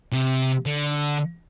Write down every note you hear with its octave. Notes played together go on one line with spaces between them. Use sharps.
C3
D3